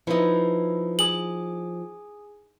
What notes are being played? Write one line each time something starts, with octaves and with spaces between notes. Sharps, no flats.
F3 D#4 E4 B4 E5
G#4 G#5 D#6 F#7